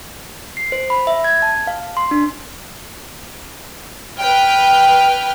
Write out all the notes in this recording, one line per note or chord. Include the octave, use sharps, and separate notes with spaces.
C7
C5
B5
E5
G#6
A5
F5
C6
D4
B4 G5 F6